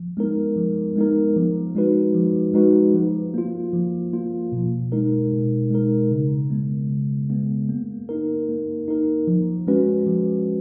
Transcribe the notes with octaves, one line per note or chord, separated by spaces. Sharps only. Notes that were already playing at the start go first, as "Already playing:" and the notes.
Already playing: F3
G#3 B3 D#4 A#4
F3
G#3 B3 D#4 A#4
F3
G#3 D#4 F#4 B4
F3
G#3 D#4 F#4 B4
F3
A#3 F4
F3
A#3 F4
B2
G#3 D#4 A#4
B2
G#3 D#4 A#4
C#3
G#3 B3
C#3
G#3 B3
A#3
D#4 A#4
A#3
D#4 A#4
F3
G#3 C#4 F#4 B4
F3